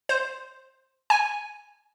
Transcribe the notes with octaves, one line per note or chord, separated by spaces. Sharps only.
C5
G#5